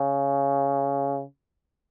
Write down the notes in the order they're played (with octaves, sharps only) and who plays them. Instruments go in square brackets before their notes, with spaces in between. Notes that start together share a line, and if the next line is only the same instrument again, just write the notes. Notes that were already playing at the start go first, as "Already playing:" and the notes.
Already playing: [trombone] C#3